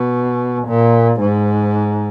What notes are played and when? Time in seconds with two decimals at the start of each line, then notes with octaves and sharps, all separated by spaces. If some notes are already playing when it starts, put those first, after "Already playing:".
Already playing: B2
0.67 A#2
1.20 G#2